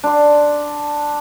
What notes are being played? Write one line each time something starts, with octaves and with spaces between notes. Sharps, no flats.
D4 C6